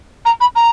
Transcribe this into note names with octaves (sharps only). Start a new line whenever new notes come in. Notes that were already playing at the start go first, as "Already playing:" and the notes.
A#5
B5
A#5